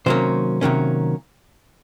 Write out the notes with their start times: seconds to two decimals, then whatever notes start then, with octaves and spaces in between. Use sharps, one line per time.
0.06 C3 D#3 F#3 A#3 C#4 C5
0.61 C3 D#3 F#3 A#3 C#4